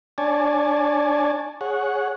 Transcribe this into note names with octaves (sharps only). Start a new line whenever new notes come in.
D4 C#5 D5 G#5 A5
G#4 C#5 F#5